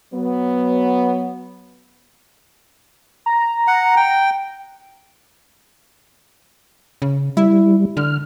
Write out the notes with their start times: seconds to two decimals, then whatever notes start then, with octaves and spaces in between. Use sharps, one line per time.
0.13 F#3 B3
3.26 A#5
3.67 F#5
3.97 G5
7.02 C#3
7.37 G3 E4
7.97 D3 F6